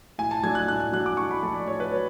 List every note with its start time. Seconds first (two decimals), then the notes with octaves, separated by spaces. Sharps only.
0.18 A2 G#5
0.31 A5
0.43 F#3 A3 D4 G#6
0.55 F#6
0.68 A2 F#6
0.80 F#6
0.92 F#3 A3 D4 F#6
1.06 D6
1.17 A2 C#6
1.31 B5
1.42 F#3 A3 D4 A5
1.55 D5
1.67 A2 C#5
1.80 B4
1.92 F#3 C#5